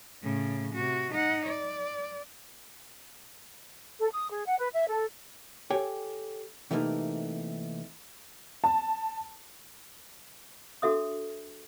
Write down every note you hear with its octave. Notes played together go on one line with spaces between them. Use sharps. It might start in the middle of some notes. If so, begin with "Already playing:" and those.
A2 C#3
C3 F#4
D#4 F#5
D5
A4
D#6
G#4
F#5
B4
E5
A4
G4 A4 C#5 G5 G#5
C3 E3 A3 A#3 D#4 A#4
A5
D4 F#4 A4 E5 D#6